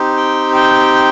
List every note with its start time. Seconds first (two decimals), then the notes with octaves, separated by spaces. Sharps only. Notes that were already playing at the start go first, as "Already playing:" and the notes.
Already playing: C4 D#4 G4
0.17 G5
0.55 G5